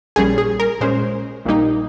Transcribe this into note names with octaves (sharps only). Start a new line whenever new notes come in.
A#1 A#2 G3 C#4 G#4
G#4
A#4
A#2 G#3 C#4 C5
A#1 A#2 G3 A#3 D#4